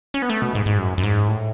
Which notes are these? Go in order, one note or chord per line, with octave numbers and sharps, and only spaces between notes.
C#4
B3
A3
B2
G#2
G#2
F#2
F#2
G#2
A2